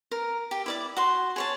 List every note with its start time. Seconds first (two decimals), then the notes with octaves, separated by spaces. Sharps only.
0.11 A#4
0.51 G4
0.66 E4 D5 D6
0.97 F#4 C6
1.36 G#4 C#5 A5